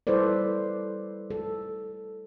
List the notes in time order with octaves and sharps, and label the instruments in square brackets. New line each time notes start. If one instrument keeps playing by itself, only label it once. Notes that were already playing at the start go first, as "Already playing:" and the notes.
[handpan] G3 E4 A4 B4 C5 D5
A4